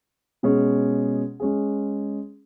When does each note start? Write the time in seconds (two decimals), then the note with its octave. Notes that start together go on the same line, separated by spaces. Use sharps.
0.43 B2 G#3 C#4 G#4
1.40 G#3 C#4 G#4